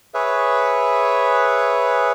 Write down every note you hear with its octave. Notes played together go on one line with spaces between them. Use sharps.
G#4 B4 C#5 E5